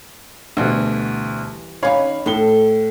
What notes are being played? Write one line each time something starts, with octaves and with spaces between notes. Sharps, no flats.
D2 B2 E3 G3
D#2 C#4 D#4 C#5 F5 B5
A2 A4 G7